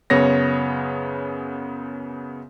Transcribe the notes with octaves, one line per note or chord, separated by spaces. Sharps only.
F#2 C#3 B3 C#5 A#6